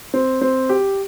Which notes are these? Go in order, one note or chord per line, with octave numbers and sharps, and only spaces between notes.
C4
C4
G4